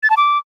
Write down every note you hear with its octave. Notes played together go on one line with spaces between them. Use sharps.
A6
A5
D6